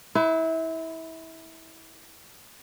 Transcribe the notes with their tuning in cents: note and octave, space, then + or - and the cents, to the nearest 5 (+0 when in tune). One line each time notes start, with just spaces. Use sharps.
E4 -25 B4 +40